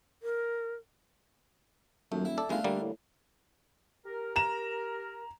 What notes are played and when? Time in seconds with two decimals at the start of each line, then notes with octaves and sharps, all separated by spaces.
0.23 A#4
2.12 D#1 F#2 A3
2.25 E4
2.38 A4 D5
2.49 G1 D#3 G#3 A3 D4 E4 F4
2.64 G2 D3 G3 A#3
2.81 A2
4.06 G4 A#4
4.36 A#5 E7